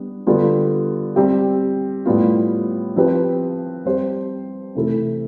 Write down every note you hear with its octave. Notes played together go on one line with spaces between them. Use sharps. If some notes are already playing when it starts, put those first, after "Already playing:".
Already playing: G3 B3 D4
D3 G3 B3 F4
G3 C4 G4
A2 G3 B3 F4
F3 C4 G4 B4
G3 C4 G4 C5
C3 E3 A3 E4 A4